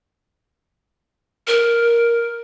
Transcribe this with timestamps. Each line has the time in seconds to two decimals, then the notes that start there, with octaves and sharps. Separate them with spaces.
1.47 A#4